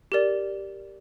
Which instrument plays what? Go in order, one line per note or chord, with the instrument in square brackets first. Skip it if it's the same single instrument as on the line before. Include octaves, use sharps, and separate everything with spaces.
[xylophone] G4 A#4 D5